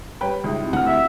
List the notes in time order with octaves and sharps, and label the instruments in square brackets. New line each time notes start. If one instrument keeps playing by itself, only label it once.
[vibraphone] G3 G4 [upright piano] C#4 B4 G5
[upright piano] C#2 D#6 [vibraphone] G3 D#4 E5
[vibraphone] C4 E4 G4
[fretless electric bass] D2 [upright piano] F#5 F6
[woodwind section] E5